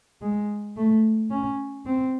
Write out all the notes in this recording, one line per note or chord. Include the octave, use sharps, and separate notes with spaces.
G#3
A3
C#4
C4